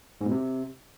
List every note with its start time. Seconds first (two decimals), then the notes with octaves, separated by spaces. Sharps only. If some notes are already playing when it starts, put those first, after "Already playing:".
0.21 G#2
0.26 B2
0.31 C3